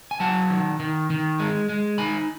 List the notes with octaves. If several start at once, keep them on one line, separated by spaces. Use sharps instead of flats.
G#5
F#3 F#5 A5
D#3
D#3
D#3
G#3
G#3
D#4 G#5 B5